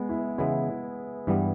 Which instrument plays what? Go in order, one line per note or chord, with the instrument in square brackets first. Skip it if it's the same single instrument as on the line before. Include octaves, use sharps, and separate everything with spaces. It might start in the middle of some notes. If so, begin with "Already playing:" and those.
Already playing: [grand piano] G#3 B3
E4
[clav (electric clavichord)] C#3 E3 G#3 B3 [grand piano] E4
[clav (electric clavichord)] G2 E3 G3 B3